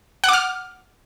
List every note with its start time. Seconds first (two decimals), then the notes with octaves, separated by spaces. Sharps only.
0.24 F#5
0.28 D6
0.33 F6